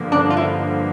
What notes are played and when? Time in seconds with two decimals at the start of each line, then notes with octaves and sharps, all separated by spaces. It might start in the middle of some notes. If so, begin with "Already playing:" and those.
Already playing: G2 D3 F3 A#3
0.12 D4
0.30 F4
0.37 E4